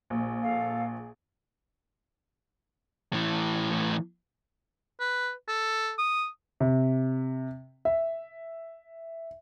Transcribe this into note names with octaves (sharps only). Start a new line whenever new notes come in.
A#1
A4 F5
G#4
A2 E3
B4
A4
D#6
C3
E5